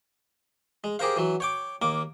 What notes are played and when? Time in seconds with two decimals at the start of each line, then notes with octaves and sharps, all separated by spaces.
0.84 G#3
0.99 G4 G#4 A#4 C5 F5
1.17 E3 F#3
1.40 C#5 G5 D6
1.82 D#2 A#3 D6